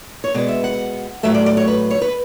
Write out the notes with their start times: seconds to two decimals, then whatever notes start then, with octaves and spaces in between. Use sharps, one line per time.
0.24 C#5
0.34 B2 G#3 B3 D5
0.49 E5
0.64 F#5
1.23 A2 F#3 A3 E5
1.34 D5
1.46 D5
1.57 C#5
1.68 B4
1.90 C#5
2.02 B4